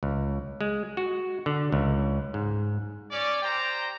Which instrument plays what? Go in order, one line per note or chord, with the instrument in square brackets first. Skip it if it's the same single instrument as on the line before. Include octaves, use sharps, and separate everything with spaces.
[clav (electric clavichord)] C#2
G#3
F#4
D3
C#2
G#2
[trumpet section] C#4 D5
G4 C5 G5 A#5